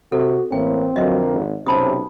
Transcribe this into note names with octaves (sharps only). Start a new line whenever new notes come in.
C3 F#4 A4
A1 A2 A#3 C4 G5
F2 D3 F#3 A#3 D#5 E5
G#1
B1 C3 C#4 A5 B5 D#6